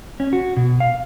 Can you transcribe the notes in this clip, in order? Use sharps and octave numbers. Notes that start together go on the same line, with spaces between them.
C#4
F#4
B2
F5